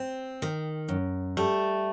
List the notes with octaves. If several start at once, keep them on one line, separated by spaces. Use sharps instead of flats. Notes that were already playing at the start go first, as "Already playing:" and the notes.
Already playing: C4
D#3
F#2
G3 A3